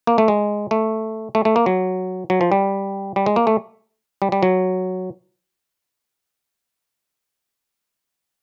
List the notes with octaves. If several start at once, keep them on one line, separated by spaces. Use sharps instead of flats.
A#3
A3
G#3
A3
A3
A3
A#3
F#3
F#3
F3
G3
G3
G#3
A#3
A3
G3
G3
F#3